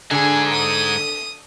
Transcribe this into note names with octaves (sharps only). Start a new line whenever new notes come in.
G#2 D3 G#4 G#5
D#6